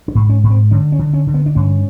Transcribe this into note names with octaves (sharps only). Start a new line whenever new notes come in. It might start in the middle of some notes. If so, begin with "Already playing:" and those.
D4
G#2
C#4
G#2
C4
D3 C#4
C#4
D3
C#4
D3
B3
D4
G2 C#4